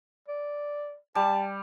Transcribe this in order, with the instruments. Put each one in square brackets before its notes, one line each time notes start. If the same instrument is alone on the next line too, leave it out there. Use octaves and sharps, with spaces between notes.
[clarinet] D5
[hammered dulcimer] G3 [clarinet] A5